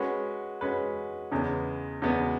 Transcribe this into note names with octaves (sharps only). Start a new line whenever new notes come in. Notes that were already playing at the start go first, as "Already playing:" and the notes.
Already playing: G#3 C#4 F#4 B4
G#3 C#4 F#4 B4
E2 C#3 G#3 B3
E2 C#3 G#3 B3